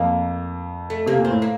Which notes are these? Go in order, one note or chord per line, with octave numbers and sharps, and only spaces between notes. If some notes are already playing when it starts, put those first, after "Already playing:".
Already playing: F2 A#3
A3
C3 A#3
A#2
C4
A2
A#3